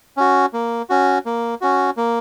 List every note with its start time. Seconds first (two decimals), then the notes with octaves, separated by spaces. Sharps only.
0.17 C#4 F#4
0.53 A#3
0.90 C#4 F#4
1.26 A#3
1.61 C#4 F#4
1.97 A#3